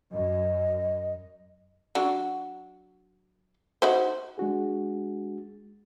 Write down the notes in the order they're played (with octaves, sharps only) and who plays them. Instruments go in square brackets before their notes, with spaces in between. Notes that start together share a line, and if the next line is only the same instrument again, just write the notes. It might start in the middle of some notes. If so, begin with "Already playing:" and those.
[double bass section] F#2 [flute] D#5
[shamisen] F#3 D4 F#4
D#4 F#4 C5
[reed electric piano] G#3 D4 F#4 G#4